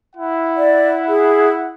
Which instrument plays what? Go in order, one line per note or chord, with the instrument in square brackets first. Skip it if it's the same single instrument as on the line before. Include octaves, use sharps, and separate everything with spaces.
[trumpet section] E4 F#5
[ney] D5
G#4